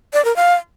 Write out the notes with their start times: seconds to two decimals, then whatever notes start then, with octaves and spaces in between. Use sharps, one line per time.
0.13 D5
0.25 A#4
0.36 F5